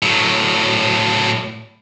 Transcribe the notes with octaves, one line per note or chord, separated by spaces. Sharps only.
A2 F#3